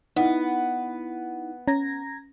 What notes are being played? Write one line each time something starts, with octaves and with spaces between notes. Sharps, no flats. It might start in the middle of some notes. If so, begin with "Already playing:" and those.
B3 D#4 E4
C#4 A#5 G#6 A#6